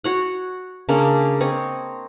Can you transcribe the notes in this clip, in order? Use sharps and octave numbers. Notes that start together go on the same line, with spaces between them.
F#4 C#5 F#5
C#3 A#3 C#4 D4
C4 C#5 D#5